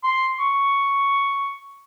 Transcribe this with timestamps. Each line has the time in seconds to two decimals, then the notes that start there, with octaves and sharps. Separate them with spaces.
0.04 C6
0.39 C#6